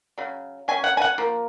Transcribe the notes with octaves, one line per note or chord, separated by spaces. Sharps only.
C#3 F#3
F#3 C#4 G#5
F#5
G#5
F#5
F3 A#3